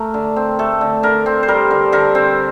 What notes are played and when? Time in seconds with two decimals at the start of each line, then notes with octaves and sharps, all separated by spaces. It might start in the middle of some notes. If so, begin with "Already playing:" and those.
Already playing: A3 A#4
0.14 D3
0.36 C4
0.59 A3 A4
0.81 D3
1.03 D3 A#4
1.26 C4
1.43 C5
1.48 G3 A#4
1.71 D3
1.92 D3 A#4
2.15 C4